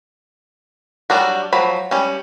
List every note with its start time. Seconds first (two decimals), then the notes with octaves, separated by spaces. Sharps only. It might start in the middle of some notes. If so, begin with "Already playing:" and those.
1.10 F#3 G3 D4 F#4
1.53 F3 F#3 B5
1.91 G3 C#4